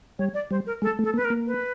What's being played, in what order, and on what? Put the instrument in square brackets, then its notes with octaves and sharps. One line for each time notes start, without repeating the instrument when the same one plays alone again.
[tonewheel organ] G3 [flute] C#5
[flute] D5
[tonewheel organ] G3 [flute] C5
[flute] A#4
[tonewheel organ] G#3 [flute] A4
[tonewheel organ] A3
[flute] A4
[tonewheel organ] A#3
[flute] B4
A#4
[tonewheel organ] A#3
[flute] B4